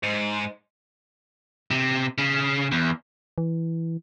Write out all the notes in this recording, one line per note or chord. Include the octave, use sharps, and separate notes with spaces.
G#2
C3
C#3
E2
E3